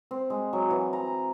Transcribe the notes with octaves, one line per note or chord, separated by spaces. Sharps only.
C4
G#3
F#3
E3
A#5